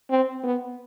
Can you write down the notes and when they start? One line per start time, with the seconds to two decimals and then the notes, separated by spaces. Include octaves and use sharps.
0.10 C4
0.44 B3